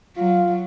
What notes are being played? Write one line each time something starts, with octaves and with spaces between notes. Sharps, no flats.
F#3 F4